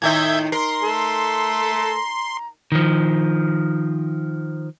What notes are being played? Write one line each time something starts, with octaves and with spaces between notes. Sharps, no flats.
A2 D#3 D#4 E5 G6 G#6
A#4 A#5 C6
A3 A4
D#3 F3